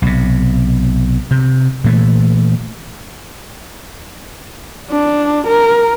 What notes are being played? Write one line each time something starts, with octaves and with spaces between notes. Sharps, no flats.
B1 C3
C3
A#2 E3 A3
D4
A#4